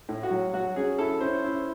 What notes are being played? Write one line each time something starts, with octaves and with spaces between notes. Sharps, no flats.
A2
F#4
F#3
F#3 F#4
C#4 G#4
E4 A4
C#4 C5
E4